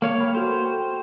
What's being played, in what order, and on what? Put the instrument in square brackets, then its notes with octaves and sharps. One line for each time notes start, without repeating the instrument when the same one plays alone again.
[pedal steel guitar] A#3 C#5 F5
[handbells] G5 B5
[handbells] F#4 A4 [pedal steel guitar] C5
[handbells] G5